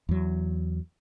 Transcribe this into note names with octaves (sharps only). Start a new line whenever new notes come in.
E2 F#3